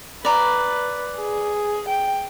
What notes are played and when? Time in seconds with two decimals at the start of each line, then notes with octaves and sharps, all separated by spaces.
0.25 B4 D5 A#5
1.18 G#4
1.89 G5